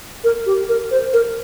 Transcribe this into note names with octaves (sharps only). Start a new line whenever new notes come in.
A#4
G4
A#4
C5
A#4